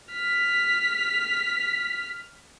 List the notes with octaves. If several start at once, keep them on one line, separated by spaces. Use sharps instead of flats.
F6 B6